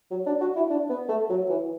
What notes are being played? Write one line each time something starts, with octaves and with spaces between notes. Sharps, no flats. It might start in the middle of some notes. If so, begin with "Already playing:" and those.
F#3
D4
F#4
E4
D4
B3
A3
F#3
E3